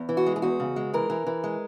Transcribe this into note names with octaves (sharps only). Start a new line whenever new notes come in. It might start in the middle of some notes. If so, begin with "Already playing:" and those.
Already playing: E2
E3
F#4
G#3
G#4
E2 F#4
C#3
G#3
E3 A#4
E3
E3
G#3